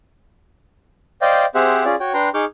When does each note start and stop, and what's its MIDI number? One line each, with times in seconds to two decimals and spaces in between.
1.22 1.46 72
1.22 1.46 74
1.22 1.46 75
1.22 1.46 77
1.22 1.46 79
1.55 1.84 60
1.55 1.84 67
1.55 1.84 68
1.55 1.84 72
1.55 1.84 76
1.55 1.84 78
1.85 1.96 61
1.85 1.96 65
1.85 1.96 68
1.85 1.96 74
2.00 2.13 66
2.00 2.13 73
2.00 2.13 79
2.14 2.29 62
2.14 2.29 71
2.14 2.29 79
2.14 2.29 82
2.14 2.29 84
2.34 2.45 63
2.34 2.45 68
2.34 2.45 85
2.34 2.45 86
2.34 2.45 89
2.34 2.45 91